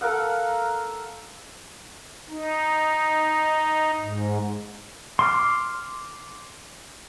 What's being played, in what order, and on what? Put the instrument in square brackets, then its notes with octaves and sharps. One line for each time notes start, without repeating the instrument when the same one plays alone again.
[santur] A4 A#4 F5 F#5
[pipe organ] D#4
G#2
[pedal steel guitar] C6 D6 F6